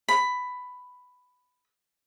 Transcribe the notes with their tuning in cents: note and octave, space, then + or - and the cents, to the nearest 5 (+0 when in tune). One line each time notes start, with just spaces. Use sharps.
B5 +10